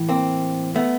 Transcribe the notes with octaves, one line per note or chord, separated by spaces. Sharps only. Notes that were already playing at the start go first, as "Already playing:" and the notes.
Already playing: A2 E3
A#3 C4
A3 B3